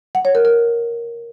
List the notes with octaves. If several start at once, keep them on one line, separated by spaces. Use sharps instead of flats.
F#5
C#5
A#4
A#4